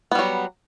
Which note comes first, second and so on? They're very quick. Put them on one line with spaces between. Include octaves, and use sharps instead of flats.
B3 G3 F#3